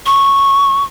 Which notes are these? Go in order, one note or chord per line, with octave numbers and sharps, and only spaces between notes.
C#6